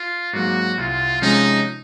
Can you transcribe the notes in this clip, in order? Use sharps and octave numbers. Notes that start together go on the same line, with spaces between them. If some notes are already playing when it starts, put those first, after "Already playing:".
Already playing: F4
G#2 F#3 A#3 F#4
C2 F4
C3 F3 G#3 C#4 D#4